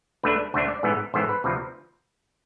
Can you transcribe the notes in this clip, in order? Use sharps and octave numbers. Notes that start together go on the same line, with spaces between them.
D2 D3 A3 D4 B4
D2 D3 A3 D4 C5
D5
A1 G#2 E3 B3
A1 G#2 E3 B3 C5
B4
D2 C3 F3